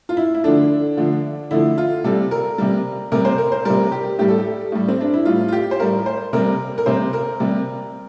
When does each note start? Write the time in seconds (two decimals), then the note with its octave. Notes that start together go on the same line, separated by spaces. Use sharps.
0.09 F4
0.17 E4
0.34 E4
0.44 D3 F3 A3 D4
0.97 D3 F3 A3
1.51 D3 F3 A3 E4
1.78 F4
2.04 C3 G3 A4
2.31 A#4
2.58 C3 G3
3.12 C3 G3 A#4
3.25 C5
3.38 A#4
3.52 C5
3.65 C3 G3 A#4
3.92 G4
4.18 A2 G3 G4
4.28 A4
4.38 G4
4.72 A2 G3
4.88 C4
5.01 D4
5.13 E4
5.25 A2 G3 F4
5.48 F4
5.52 G4
5.71 C5
5.80 A2 G3 A#4
6.06 C5
6.33 C3 G3 A#4
6.78 A#4
6.86 C3 G3 C5
7.13 A#4
7.40 C3 G3